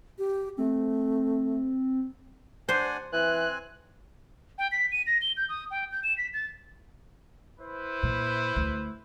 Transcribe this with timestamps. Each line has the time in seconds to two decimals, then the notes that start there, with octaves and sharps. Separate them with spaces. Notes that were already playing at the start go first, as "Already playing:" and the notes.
0.18 G4
0.58 A3 C4
2.69 D4 C5 F#5 G#5
3.13 E3 C4 G#5 F#6
4.58 G5
4.72 B6
4.92 D#7
5.07 A#6
5.22 G7
5.37 G6
5.49 D#6
5.71 G5
5.91 G6
6.03 E7
6.18 B6
6.34 A6
7.58 E4 B4 C5
8.03 A#2
8.56 D2